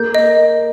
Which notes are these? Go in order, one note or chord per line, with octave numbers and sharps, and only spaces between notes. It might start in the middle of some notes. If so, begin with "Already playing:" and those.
Already playing: A#3 G6
D#5